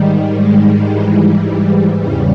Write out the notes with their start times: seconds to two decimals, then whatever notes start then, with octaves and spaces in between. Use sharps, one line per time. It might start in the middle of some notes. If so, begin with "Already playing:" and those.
Already playing: G#2 D#3 G3
0.39 G#3
0.91 G#2 E3 G3
1.44 G3
1.98 E2 C#3 G3